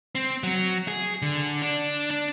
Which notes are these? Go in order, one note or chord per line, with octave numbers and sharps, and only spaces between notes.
C4
F#3
G#4
D3
D4
D4